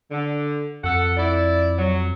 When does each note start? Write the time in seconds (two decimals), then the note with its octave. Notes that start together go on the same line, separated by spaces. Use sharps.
0.11 D3
0.84 F2 A4 F#5
1.17 E4 D5
1.79 F#3